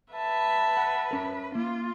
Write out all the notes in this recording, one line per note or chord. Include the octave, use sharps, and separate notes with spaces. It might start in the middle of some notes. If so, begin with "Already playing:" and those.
B4 E5 A5
F#5
C#4 A#4
A#3 F4